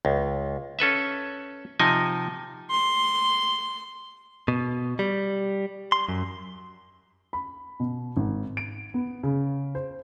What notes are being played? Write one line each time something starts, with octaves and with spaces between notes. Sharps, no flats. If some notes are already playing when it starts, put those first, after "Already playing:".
C#2
C#4 A4 B4 E5
C3 F3 D#4 D#5 G#5
C6
B2
G3
C6
F#2
B5
B2
G#1
D7
B3
C#3
C5